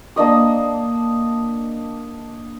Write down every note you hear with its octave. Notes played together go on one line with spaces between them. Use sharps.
A#3 D4 D#5 D#6